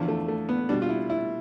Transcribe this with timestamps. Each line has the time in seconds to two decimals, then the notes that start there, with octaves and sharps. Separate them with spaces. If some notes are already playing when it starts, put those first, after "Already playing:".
Already playing: E2 D3 F3
0.08 A3
0.28 A3
0.49 B3
0.69 B2 G3 D4
0.82 F4
0.89 E4
1.10 E4